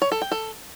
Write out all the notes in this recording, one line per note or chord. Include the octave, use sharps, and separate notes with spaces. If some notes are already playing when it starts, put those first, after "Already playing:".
C#5
A4
G5
A4